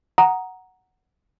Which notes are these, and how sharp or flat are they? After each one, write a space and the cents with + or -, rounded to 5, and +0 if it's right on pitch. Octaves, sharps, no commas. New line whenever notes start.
F#5 +5 A#5 +0 D#6 +0